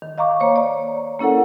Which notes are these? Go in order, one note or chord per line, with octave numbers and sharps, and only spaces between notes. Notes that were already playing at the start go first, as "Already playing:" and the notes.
D#3
D#5 F5 A#5 C#6 D6
A#3 C5 C#5
D5 A#5
A#3 C#4 E4 A4 A#4 F#5